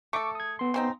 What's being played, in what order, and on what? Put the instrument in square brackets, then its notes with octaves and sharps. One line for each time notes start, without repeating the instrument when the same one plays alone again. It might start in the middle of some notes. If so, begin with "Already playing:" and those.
[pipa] A3 A4 [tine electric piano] C#6 D6
[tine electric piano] D#6 G#6
B3 C6
[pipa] C#3 C4 D#4